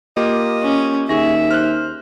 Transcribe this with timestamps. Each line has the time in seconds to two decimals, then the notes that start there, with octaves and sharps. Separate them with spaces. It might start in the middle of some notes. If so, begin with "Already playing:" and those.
0.17 A#3 F4 G4 D#5
0.63 C#4
1.09 D#2 G#4 E5 C#6 A#6
1.51 C5 F6 F#6